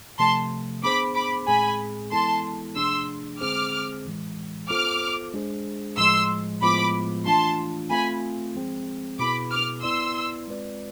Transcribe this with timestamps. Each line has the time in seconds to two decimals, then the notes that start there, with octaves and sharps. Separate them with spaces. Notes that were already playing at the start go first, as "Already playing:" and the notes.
0.19 C3 F3 A3 A5 C6
0.83 B3 D4 G#4 C5 B5 D6
1.15 B5 D6
1.47 A2 G#3 C4 G#4 G#5 B5
2.12 E3 G#3 B3 E4 A4 A5 C6
2.76 C3 F3 A3 D4 G#4 C6 E6
3.40 D3 G#3 C4 G#4 C5 D6 F6
4.05 A2 E3 G#3
4.69 B3 F4 A4 C5 D6 F6
5.33 G#3 D4 G#4 C5
5.98 A2 F3 G#3 C6 E6
6.62 A2 F3 G#3 B3 F4 B5 D6
7.26 E3 A3 D4 F4 A5 C6
7.90 A3 C4 F4 G#5 B5
8.55 F3 G#3 C4 G#4
9.19 B2 B3 E4 G#4 B4 B5 D6
9.51 D6 F6
9.83 B3 E4 B4 D5 C6 E6
10.48 G#3 C4 F4 B4 D5